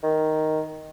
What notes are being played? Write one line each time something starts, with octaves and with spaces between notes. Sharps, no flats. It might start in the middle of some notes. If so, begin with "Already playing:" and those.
D#3